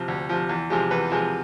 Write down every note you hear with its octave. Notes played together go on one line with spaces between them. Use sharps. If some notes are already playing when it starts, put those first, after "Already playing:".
Already playing: C3 F3
D2
C3 F3
E2
C3 F3 G#3
E2 B4
C3 F3 G#3